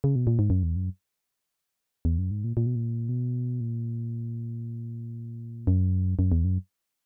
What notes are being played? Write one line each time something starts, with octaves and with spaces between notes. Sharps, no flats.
C#3
B2
A#2
G#2
F#2
E2
F#2
E2
F#2
G#2
A#2
A#2
B2
A#2
B2
A#2
F#2
F#2
E2
F#2